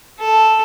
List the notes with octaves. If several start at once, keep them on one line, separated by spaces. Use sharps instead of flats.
A4